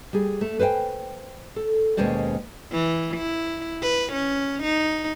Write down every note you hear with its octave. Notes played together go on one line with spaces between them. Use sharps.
G3 G#4
A3
B4 C5 F5 G5 G#5
A4
D#2 B2 G#3 C#4 C5 D5
E3
E4
B4
C#4
D#4